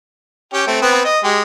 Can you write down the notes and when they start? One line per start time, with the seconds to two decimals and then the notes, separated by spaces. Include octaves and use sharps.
0.54 C#4 G4 G5
0.67 A3 C4
0.82 B3 C4 B4
1.05 D#5
1.24 G#3 G4